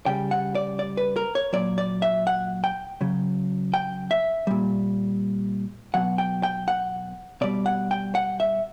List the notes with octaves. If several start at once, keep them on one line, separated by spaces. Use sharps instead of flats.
C#3 G3 G5
F#5
D5
D5
B4
A#4
C#5
A#2 F#3 D5
D5
E5
F#5
G5
C#3 F#3
G5
E5
A#2 G3
B2 F#3 F#5
G5
G5
F#5
B2 G3 D5
F#5
G5
F#5
E5